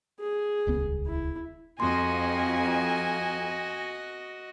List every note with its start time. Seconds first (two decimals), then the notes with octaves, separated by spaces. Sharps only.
0.19 G#4
0.67 D#1 C#2 B3
1.07 E4
1.80 F2 F#4 D#5 G#5 C6